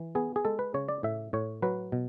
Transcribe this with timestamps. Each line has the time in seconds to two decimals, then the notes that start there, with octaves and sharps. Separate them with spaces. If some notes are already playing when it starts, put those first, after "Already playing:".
Already playing: E3
0.15 B3 G#4
0.36 G#4
0.45 G#3 A4
0.59 B4
0.74 C#3 C#5
0.89 D5
1.03 A2 E5
1.33 A2 C#5
1.62 F#3 B4
1.92 B2